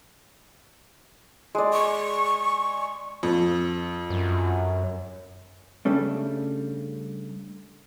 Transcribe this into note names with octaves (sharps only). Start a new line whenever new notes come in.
G#3 D5
C#6
F2
F#2
C#3 G3 A3 C#4 D4